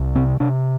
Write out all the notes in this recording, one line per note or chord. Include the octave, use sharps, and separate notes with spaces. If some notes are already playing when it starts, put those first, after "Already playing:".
Already playing: C2
C3 C4
C3 D4